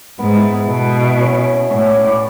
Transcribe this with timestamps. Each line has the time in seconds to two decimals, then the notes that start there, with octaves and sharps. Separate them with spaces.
0.18 G#2 B3
0.36 E4
0.53 B3
0.69 B2 A4
0.87 A4
1.04 E5
1.20 C#4
1.37 C#4
1.54 C#4
1.71 A2 C#4
1.87 D5
2.05 D5